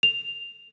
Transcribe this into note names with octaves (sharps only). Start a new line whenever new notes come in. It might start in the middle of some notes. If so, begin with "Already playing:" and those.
F7